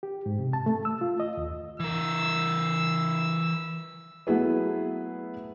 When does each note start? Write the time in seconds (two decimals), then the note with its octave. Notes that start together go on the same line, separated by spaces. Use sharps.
0.03 G4
0.26 G#2
0.39 C3
0.53 A5
0.66 A3
0.85 E6
1.01 F4
1.20 D#5
1.37 D#2
1.80 E3 A#4 E6
4.27 F#3 A3 B3 E4 G#4 B4